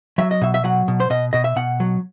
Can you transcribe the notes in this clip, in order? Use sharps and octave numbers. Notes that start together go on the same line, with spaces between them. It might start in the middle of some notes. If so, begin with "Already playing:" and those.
F#3 E5
D#5
B2 E5
E5
F#3 F#5
B2
C5
B2 D#5
B2 D#5
E5
B2 F#5
F#3